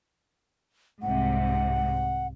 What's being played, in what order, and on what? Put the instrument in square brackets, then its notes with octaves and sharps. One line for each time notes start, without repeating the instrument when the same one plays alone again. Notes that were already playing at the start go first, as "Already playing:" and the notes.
[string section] C2 G#2 C3 [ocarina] F#5